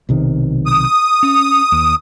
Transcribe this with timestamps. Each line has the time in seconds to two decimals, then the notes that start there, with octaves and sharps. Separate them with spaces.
0.09 B1 C3 D#3
0.66 D#6
1.23 C#4
1.72 D#2